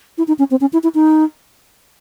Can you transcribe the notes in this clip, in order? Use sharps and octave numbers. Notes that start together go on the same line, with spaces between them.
E4
D#4
C#4
C4
C#4
E4
E4
D#4